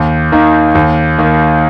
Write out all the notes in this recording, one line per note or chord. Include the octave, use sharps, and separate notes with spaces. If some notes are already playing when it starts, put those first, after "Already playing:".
Already playing: D#2
D#3 A#3 D#4
D#2
D#3 A#3